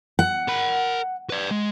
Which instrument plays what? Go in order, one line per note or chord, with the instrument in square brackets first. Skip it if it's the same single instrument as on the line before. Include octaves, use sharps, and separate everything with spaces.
[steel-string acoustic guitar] F#5
[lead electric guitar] A#4 B5
B4 D5
G#3